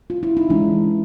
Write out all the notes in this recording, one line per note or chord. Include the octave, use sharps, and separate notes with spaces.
F4
E4
D#4
E3 G#3 C#4 D4